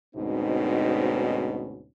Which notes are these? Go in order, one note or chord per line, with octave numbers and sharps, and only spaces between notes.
D2 G#2 B2 C4 C#4 D#4